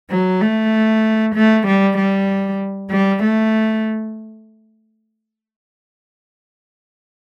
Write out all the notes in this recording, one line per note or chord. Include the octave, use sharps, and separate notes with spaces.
F#3
A3
A3
G3
G3
G3
A3